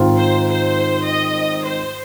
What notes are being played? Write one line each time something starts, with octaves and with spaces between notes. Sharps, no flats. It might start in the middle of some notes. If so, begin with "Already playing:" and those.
Already playing: G#2 D#3 C4 F4
C5
C5
D#5
C5